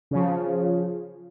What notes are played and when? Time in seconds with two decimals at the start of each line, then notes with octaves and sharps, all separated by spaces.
0.11 C#3 F3